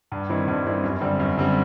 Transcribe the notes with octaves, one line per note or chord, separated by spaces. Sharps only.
G2
D#3 G3 C4 E4
G2
D#3 G3 C4 E4
F#2
D3 G3 C4
F#2
D3 G3 C4